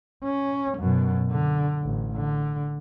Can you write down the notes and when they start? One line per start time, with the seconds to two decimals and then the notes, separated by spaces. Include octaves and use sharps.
0.24 C#4
0.78 F#2 B2
1.30 D3
1.83 A1
2.16 D3